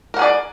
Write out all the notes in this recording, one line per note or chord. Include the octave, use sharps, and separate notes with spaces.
G#4 A#4 D5 F#5